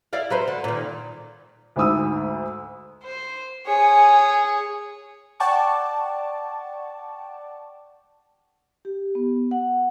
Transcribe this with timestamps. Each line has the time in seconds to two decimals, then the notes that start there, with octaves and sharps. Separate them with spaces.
0.13 E4 D5 F5
0.30 F#3 B4 C5
0.47 D3
0.64 A#2 D#3
1.76 D2 G#2 B5 D#6 E6
3.03 C5
3.67 G#4 C#5 G#5
5.40 D5 F#5 G5 A5 C#6 D6
8.85 G4
9.15 B3
9.51 F#5